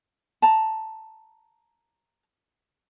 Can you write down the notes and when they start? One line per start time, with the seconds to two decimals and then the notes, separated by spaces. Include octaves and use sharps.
0.42 A5 A#5